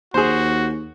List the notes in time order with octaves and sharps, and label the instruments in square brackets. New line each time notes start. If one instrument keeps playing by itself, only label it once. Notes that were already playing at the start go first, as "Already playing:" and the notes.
[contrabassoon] D#2 [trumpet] F#4 [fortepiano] G#4 C5